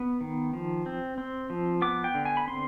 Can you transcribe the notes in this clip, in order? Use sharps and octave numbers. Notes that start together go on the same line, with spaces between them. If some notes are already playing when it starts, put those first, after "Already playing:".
Already playing: B3
D#3
F3
C4
C4
F3
B3 D6
G5
D3
G#5
B5
C4 C6